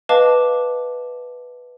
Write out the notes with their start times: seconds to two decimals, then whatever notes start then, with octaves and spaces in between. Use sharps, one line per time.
0.09 B4 D#5 F5 A5 D6